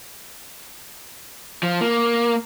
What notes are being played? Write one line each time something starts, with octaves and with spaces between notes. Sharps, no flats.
F3
A#3